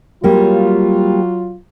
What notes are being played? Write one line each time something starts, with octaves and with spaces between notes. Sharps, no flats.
F#3 G3 A#3 F4